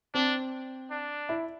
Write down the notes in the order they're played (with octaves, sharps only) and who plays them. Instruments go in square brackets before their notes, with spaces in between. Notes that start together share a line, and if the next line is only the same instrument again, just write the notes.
[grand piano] C4 [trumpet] D4
[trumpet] D4
[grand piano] E4